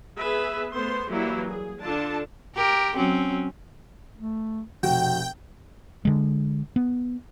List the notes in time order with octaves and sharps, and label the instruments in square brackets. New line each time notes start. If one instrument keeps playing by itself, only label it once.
[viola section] B3 G#4 B4 E5
A3 B3 C5 C6
E3 F#3 G3 A#3 E4
G#4
D3 D4 F4 A4 A5
[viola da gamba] G4 A#4
F#3 C4 C#4
[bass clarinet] A3
[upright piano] F1 F#4 [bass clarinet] B2 [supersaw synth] G5
[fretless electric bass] D3 G#3
B3